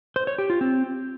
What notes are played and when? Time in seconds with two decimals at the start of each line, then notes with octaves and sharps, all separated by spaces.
0.16 C5
0.27 C#5
0.38 G4
0.50 F4
0.61 C4